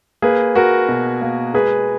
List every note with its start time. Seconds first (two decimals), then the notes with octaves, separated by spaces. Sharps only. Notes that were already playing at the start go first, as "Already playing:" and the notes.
0.22 A#3 G#4 B4
0.55 A#3 F#4 A#4
0.89 B2
1.22 A#3
1.54 G#3 G#4 B4